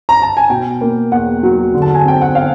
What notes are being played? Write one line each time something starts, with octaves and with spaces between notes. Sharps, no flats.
A#5
A5
G#5
B2 G5
A#3
E2 F#5
F#3
D3
A5
G#5
C4 G5
F#5
F5